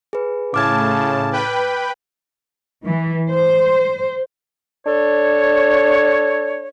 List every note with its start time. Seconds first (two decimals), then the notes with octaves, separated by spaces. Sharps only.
0.13 G#4 B4
0.54 A2 C#3 A5 D6 F6 G#6
1.32 B4 G5 B5
2.86 E3
3.29 C5
4.87 D4 A4 C#5